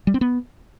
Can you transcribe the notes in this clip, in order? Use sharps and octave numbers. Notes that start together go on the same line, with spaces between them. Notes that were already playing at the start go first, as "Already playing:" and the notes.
G3
C4
B3